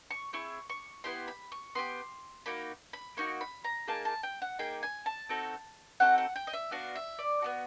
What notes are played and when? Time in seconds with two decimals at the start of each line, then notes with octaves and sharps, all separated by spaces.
0.11 C#6
0.33 C4 E4 G#4 C#6
0.70 C#6
1.04 B3 E4 G4 C6
1.28 B5
1.52 C#6
1.75 B3 E4 G4 C6
2.46 A#3 D#4 F#4 B5
2.93 B5
3.17 A#3 D#4 F#4 C#6
3.41 B5
3.64 A#5
3.88 A#3 D#4 G#4 A5
4.05 A5
4.23 G5
4.42 F#5
4.59 A#3 D#4 G#4 G5
4.83 G#5
5.06 A5
5.29 C4 D#4 F#4 A4
6.00 C4 D#4 F#4 A4 F#5
6.18 F#5
6.36 G5
6.47 D#5
6.53 E5
6.71 B3 D4 F#4 F5
6.95 E5
7.19 D5
7.42 B3 D4 F#4